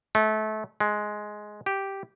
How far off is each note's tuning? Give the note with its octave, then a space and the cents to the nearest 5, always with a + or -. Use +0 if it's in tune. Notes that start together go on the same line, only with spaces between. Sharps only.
A3 -30
G#3 +10
G4 -5